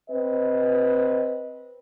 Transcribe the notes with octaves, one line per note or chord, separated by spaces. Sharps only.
C4 B4 D#5